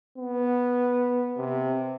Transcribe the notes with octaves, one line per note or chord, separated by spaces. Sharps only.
B3
C3